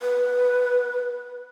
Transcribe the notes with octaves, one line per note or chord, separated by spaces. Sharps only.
B4